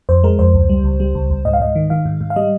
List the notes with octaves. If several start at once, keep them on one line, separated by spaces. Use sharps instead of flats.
F2 C5
G#3 A#4
F2 C5
C#2
G3
C#2
G3
C#2
C#2
G#2 D#5
F5
G#2 D#5
D#3
D#3 F5
G#2
G#2
F5
G3 D#5